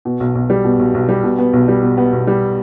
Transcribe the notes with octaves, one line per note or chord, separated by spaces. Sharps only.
B2
B1
B1
G3
B2
B1
B1
G3
B2
B3
B1
G3
B2
B3
B1
G3